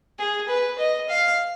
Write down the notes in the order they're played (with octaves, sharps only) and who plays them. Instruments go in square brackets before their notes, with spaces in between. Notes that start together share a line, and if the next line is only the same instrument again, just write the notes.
[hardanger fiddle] G#4
B4
D#5
F5